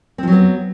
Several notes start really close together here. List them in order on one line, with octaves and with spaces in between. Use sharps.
C4 F3 F#3 B3